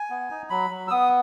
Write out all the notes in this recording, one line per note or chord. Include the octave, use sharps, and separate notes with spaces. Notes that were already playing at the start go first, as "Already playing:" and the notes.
Already playing: G#5
B3
D#4
F#3 B5
F#3
E6
B3 D#6